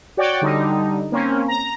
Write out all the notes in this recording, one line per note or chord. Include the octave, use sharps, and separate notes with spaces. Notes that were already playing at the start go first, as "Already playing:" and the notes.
F#4 C#5 D5 G5
D3 G3 D#4
A#3 C4 C#4
A#5